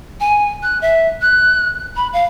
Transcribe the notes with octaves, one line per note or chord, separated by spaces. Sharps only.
G#5
F#6
E5
F#6
B5
F5